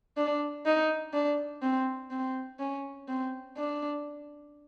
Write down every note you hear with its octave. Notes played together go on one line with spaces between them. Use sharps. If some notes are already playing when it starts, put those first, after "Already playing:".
D4
D#4
D4
C4
C4
C#4
C4
D4